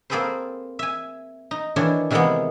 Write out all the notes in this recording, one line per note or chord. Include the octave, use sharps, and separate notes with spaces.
A#3 C4 G#4 A4 B4 C5
E5 G#5
D#4
D#3 E3 D4 C#5
C3 D#3 E3 G#3 A#3 B3